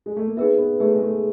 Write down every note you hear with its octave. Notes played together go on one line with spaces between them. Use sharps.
G#3
A3
A#3
B3 D#4 G#4 B4 E5
B3
A3 D#4 G#4 B4 E5
G#3
A3